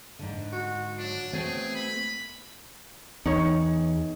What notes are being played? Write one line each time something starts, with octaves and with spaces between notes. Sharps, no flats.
G#2 D3
F#4
F#3 D4
A3 B3 C4 G#4
B5
E2 D#4 C#5